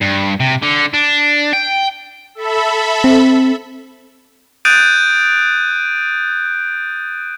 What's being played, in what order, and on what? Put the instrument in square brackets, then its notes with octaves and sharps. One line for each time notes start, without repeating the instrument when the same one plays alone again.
[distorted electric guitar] G2
C3
D3
D4
G5
[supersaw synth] A4 E5 B5
[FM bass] C4
[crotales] D#6 F#6 G6 A6 D7 D#7